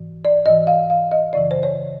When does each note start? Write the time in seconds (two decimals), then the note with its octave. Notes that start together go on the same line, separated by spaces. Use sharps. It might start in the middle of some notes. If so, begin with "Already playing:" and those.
Already playing: G#2 E3
0.25 D5
0.46 G#2 E3 D#5
0.67 F5
0.90 F5
1.12 D#5
1.33 F#2 C#3 E3 D5
1.51 C5
1.63 C#5